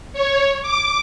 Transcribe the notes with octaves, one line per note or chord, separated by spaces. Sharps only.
C#5
D6